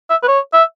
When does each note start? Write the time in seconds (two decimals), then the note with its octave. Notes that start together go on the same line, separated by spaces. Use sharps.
0.10 E5
0.23 B4
0.28 C#5
0.53 E5